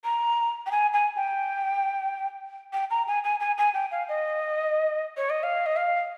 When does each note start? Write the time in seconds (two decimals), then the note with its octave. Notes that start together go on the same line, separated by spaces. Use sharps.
0.04 A#5
0.66 G5
0.71 G#5
0.93 G#5
1.16 G5
2.73 G5
2.91 A#5
3.07 G#5
3.24 G#5
3.40 G#5
3.58 G#5
3.74 G5
3.91 F5
4.09 D#5
5.17 C#5
5.30 D#5
5.43 F5
5.66 D#5
5.76 F5